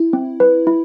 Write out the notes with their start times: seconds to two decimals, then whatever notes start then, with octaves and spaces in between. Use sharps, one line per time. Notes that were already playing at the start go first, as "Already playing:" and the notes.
Already playing: E4
0.13 C4
0.40 B4
0.67 E4